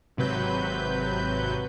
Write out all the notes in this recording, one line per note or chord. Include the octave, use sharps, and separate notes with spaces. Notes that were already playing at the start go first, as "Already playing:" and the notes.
G#1 C3 F#3 B4 G6